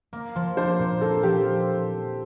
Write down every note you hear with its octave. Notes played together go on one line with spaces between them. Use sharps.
A#3
F3
D4 C5
A#2
A#3 A4
F3 G4